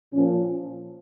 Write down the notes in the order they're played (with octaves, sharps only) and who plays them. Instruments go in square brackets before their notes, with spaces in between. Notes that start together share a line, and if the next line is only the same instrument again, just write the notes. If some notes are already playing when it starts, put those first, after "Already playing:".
[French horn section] A#2 F3 C#4